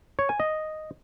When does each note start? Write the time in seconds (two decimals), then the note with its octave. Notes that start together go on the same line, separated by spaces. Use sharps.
0.19 C#5
0.29 G#5
0.40 D#5